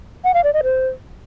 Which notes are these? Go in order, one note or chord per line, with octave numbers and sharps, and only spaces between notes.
F#5
F5
D5
D#5
C5